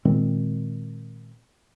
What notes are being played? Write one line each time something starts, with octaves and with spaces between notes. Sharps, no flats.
A#2 D#3 G#3 C4